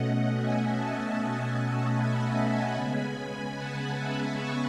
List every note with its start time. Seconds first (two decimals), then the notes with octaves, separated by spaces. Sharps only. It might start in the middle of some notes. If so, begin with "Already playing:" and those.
Already playing: B2 A3 C#4 D#5 F#5
0.35 E5 G#5
0.74 F#5 A5
1.94 G#5 B5
2.73 C#3 G#3 B3
3.52 F#5 A5
3.92 E5 G#5
4.32 A5 C#6